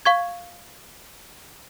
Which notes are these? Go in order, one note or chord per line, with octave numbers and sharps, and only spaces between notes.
F5 C#6 G#6